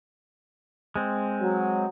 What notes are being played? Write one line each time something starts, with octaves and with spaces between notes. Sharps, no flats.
G#3 C4
F#3